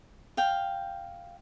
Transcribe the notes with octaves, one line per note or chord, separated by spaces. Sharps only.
F5 G5